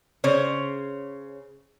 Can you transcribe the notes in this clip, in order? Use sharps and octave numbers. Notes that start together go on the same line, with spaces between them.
C#3 C5 C#5